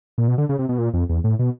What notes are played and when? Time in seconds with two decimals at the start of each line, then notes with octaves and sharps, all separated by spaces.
0.18 A#2
0.28 B2
0.38 D3
0.49 C#3
0.59 C3
0.69 B2
0.78 A#2
0.94 F2
1.09 E2
1.24 A2
1.39 B2